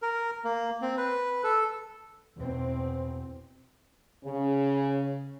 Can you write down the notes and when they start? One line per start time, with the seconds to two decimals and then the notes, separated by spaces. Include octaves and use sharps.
0.02 A#4
0.44 A#3
0.82 C4
0.98 B4
1.44 A4
2.36 E2 B2 C4
4.24 C#3